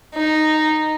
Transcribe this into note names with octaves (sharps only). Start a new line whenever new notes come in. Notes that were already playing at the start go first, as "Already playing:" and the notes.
D#4